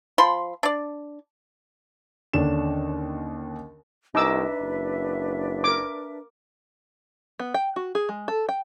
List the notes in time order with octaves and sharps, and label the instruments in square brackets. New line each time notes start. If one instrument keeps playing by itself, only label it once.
[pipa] F3 B5 C6
D4 D5
[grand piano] D#2 D3 C#4 D4 E7
[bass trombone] C2 [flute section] D4 B4 E5 [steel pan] D#4 D6 E6
[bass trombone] F#1
[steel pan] A#4 D6
[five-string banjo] B3
G5
F#4
G#4
G#3
A4
G5